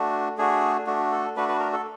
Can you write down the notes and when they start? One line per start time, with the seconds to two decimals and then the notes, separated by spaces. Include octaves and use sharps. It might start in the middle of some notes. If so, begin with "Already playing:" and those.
Already playing: A3 D4 F#4
0.38 A3 D4 F#4 G#4
0.86 A3 D4 F#4
1.12 A4
1.36 A3 D4 F#4 B4
1.49 B4
1.60 A#4
1.73 A4